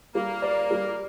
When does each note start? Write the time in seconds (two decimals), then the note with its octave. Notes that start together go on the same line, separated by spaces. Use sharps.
0.15 G3 A#3
0.42 D5
0.71 G3